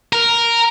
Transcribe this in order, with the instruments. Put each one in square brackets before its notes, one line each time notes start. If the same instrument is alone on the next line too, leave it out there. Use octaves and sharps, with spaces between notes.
[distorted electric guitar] A#4